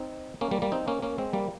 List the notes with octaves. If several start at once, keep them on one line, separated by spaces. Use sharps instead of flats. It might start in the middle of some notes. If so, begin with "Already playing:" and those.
Already playing: C4 D#4
A#3 C#4
G3 A#3
G3 A#3
C4 D#4
A#3 C#4
A#3 C#4
G#3 C4
G3 A#3